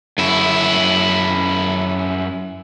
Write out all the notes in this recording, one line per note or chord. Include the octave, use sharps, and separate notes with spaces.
F#2 E4